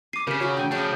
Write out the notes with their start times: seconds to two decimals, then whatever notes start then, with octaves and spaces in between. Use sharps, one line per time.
0.13 G#5 D6 C7
0.27 C#3 G4 A#4 B6
0.40 F#3 C#4 E4 F#4
0.57 A3 G5 G#5
0.71 C#3 F3 D4 C#5 D6